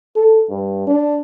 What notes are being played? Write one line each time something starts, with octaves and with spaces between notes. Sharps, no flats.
A4
G2
D4